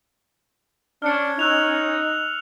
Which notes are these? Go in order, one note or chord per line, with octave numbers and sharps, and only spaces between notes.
C#4 D4 F6 C#7
D#4 E6 F#6 F7